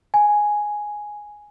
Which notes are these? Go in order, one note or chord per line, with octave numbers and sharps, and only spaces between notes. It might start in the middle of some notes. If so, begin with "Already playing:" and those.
G#5